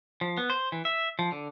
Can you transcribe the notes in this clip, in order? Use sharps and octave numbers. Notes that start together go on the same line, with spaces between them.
F3
B3
C5
E3
E5
F3
D3